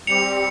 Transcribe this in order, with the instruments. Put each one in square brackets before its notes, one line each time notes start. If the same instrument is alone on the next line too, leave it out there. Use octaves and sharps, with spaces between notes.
[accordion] G3 C4 G4 [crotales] C#7 F7